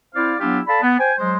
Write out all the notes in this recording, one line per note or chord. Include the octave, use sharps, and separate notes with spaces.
C4 E4 C5 D5 F5
F#3 B3 D4 E4 F4 G4
A4 D5 F5 A5 B5
B3
C5 G5 G#5
F#3 G#3 C5